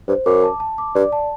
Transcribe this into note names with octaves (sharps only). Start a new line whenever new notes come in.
G2 C5
F#2 D6
A5
A5
D6
G2 D5
A5